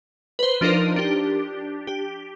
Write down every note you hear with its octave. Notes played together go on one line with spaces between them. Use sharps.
B4 C5
F3 D4 D#4 F4 A#4
D4 G4
G4